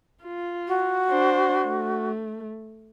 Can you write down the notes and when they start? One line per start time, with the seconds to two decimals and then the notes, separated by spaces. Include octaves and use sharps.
0.24 F4
0.67 F#4
1.10 D4 C5
1.66 A3